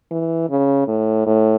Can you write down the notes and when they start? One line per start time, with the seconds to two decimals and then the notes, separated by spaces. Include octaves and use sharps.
0.11 E3
0.50 C#3
0.88 A2
1.27 A2